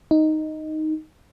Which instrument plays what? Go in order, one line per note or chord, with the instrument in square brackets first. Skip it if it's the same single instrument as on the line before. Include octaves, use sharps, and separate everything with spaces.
[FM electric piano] D#4